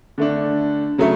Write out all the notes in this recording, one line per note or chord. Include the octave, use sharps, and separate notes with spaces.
D3 A3 D4
C#3 F#3 A3